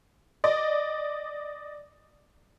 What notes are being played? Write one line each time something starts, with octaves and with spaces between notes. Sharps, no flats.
D5 D#5